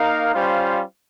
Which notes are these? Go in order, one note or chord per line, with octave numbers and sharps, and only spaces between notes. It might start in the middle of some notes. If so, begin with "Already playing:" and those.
Already playing: A#3 D#4 A#4 F5
G3 C#4 F4 C5 F5